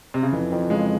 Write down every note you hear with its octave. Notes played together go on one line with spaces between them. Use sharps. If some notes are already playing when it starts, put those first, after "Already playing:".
C3
C#3
F2 E3
F2
C#3 G#3